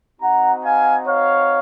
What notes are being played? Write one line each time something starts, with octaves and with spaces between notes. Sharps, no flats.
C4 D#4 F#4 F#5 A#5
F5 G#5
C#5 F5